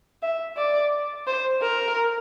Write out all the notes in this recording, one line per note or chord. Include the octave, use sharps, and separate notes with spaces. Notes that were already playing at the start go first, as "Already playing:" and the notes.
E5
D5
C5
A#4